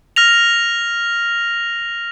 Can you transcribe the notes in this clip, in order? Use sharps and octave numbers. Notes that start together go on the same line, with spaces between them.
F6 A#6 F7